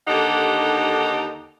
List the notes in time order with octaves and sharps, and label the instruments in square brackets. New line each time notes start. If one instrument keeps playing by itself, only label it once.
[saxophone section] D#2 D3 D#4 G4 A4 F#5